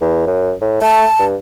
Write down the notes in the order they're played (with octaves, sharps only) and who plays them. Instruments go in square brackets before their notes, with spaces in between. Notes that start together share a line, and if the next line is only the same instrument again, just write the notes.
[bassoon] E2
F#2
A2
[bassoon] A3 [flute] A5
[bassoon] G2